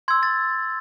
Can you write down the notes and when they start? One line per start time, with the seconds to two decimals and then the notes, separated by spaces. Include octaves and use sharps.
0.08 C6 E6 G#6
0.23 A6